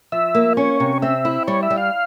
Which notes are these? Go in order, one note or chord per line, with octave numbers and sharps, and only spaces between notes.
F3 E5
A#3
C#4 C#5
C3
C4 E5
E4
G3 C#5
E5
G3
F5